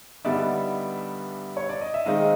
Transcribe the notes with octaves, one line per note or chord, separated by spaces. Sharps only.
G2 D3 G3 B3 D#4 D5 E5
C#5
D5
D#5
E5
D#3 G#3 C4 D#4 D#5 F5